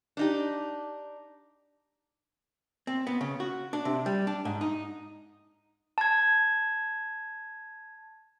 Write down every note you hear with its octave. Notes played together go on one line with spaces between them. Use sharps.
D4 D#4 G4
C4
B3
C#3
F#4
D4
C3
G3
D4
G#2
D#4
A5 G#6